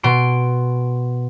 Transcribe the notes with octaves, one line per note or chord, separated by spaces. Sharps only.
B2 C6 D7